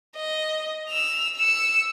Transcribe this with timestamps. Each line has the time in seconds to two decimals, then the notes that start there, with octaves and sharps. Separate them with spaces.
0.16 D#5
0.89 E6 F7
1.38 E6 C#7